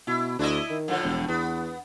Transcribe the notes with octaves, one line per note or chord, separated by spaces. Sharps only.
B2 E4
D2 D4 E4 D#5
D#3
A2 D3 F3
E1
E2 B3